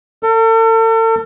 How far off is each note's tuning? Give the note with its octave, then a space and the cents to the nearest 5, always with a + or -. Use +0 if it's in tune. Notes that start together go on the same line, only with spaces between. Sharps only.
A4 +40